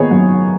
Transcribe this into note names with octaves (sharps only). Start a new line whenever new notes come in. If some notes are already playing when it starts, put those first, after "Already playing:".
Already playing: D#3 B3 D#4 G#4 C#5
F#2